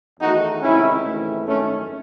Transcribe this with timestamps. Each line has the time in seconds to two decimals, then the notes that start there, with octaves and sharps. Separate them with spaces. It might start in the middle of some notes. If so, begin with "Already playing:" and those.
0.20 E2 D#3 A3 D#4 F#4
0.62 C#2 C3 D#3 A3 C#4 E4
1.04 G#1 G#2 E3 A3
1.46 G#1 F#2 D#3 A3 C#4